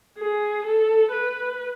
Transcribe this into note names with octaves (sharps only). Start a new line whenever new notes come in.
G#4
A4
B4